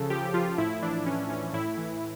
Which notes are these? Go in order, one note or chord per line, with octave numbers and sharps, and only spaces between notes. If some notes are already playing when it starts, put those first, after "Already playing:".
Already playing: C#3 F3 A4
F3 G4
F3 F4
A2 E4
E3 D4
E3 C#4
E3 C#4
A2 E4
E3